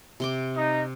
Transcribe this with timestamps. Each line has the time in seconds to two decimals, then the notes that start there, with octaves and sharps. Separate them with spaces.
0.20 C3 C6 D6
0.56 D#4